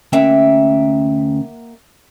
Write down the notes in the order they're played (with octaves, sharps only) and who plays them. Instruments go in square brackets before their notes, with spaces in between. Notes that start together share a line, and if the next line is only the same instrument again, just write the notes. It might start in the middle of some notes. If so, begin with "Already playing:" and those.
[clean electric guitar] D2 C#4 G5 [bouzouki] A#3 E5 F#5